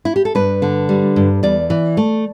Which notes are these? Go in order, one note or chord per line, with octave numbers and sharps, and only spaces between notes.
E4
G4
A4
G2 B4
D3
G3
G2
E2 D5
E3
A3